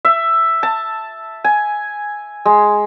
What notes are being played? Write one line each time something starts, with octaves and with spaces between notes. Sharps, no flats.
E5
A5
G#5
G#3